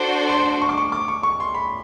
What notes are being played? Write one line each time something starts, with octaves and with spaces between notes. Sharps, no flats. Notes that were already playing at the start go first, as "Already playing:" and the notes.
Already playing: D4 F#4 A4 C5
C6
C#6
D6
C#6
D6
C#6
C#6
C6
B5